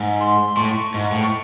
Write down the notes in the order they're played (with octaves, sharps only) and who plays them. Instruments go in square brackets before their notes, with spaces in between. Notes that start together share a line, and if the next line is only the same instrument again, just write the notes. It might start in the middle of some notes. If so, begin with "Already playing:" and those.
Already playing: [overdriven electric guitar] G#2
[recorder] C6
[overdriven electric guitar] A2 [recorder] C#6
[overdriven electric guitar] G#2
A2